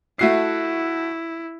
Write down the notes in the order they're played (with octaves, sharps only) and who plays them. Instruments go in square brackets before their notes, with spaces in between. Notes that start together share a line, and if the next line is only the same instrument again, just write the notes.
[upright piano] A3 F#4 C7 [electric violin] E4